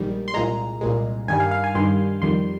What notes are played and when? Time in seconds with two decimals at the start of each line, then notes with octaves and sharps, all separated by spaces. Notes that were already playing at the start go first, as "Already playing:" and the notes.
Already playing: A#1 G#2 D#3 G3
0.28 C6
0.34 C2 A#2 G#3 A#5
0.81 C2 A#2 G#3
1.28 G2 D#3 G3 G#5
1.40 F5
1.51 F5
1.64 G#5
1.75 G2 D#3 G3 C6
2.22 F2 D#3 G3 C6